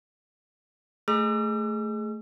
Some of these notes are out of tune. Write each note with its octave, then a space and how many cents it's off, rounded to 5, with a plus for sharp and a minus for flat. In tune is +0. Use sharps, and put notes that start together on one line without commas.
A3 +0 G#4 +5 E6 +45